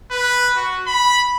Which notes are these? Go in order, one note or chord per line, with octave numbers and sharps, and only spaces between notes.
B4
F#4
B5